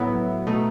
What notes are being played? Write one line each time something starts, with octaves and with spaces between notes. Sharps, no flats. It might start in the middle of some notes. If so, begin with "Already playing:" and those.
Already playing: A2 F#3 B3 E4
B2 A3 D#4